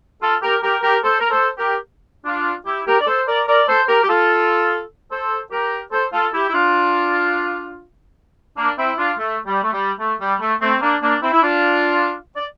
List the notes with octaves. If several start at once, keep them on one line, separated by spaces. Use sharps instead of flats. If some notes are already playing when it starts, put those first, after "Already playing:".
F4 A4
G4 A#4
G4 A#4
G4 A#4
A4 C5
A#4
A4 C5
G4 A#4
D4 F4
E4 G4
G4 A#4
D5
A4 C5
A#4 D5
A#4 D5
A4 C5
G4 A#4
G4
F4 A4
A4 C5
G4 A#4
A4 C5
F4 A4
E4 G4
E4
D4 F4
A#3 D4
C4 E4
D4 F4
A3
G3
A3
G3
A3
G3
A3
A3 C4
A#3 D4
A#3 D4
C4 E4
E4
D4 F4
D5